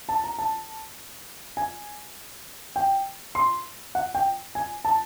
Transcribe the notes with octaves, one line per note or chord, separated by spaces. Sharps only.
A5
A#5
A5
G#5
G5
C6
F#5
G5
G#5
A5